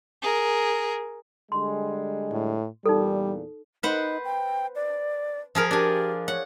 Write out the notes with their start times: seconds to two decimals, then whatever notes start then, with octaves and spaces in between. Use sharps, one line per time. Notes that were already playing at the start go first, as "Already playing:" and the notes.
0.22 G#4 A#4
1.52 D3 G3 G#3 C6
2.32 A2
2.86 E2 A#2 G3 D#4 A4
3.83 D#4 B4 C5 F#5
4.24 G5
4.75 D5
5.55 F3 G#4 A#4
5.71 D4 G4 G#5
6.28 C#5 F#5